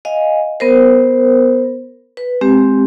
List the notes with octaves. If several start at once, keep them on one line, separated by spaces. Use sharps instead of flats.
D#5 F5 G#5
B3 A#4 C5
B4
G#3 C4 G4